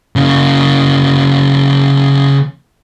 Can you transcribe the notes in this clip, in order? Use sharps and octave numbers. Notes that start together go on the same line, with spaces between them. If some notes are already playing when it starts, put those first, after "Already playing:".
C#3 A#3